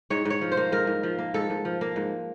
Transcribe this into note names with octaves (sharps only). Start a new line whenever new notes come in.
G#2 C#5
G#2
C#5
F3
C5
A#3
G#2 A#4
G#2
F3
A#3
G#2 A4
G#2
F3
A#3
G#2